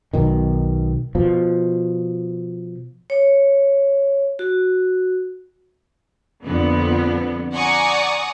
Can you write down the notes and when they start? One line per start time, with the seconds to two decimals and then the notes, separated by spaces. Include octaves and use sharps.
0.14 B1 B2 D#3
1.15 B2 F3
3.10 C#5
4.39 F#4
6.45 F2 A#2 D3 B3
7.53 D5 F#5 G#5 A#5 C#6 D#6